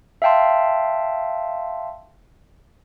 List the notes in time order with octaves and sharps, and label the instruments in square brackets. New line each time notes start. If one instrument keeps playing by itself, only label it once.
[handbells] E5 F5 G5 A5 C6